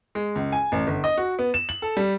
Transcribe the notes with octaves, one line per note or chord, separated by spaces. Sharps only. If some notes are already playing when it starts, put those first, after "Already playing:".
G#3
C#2
G#5
A1
G1
D#5
F#4
B3
E7
F#7
A4
G3